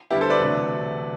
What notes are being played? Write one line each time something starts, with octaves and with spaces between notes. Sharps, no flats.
D2 D3 G3 B3 E4 G4
A4 C5
B4 D5
E1 D2 C3 F#3 A3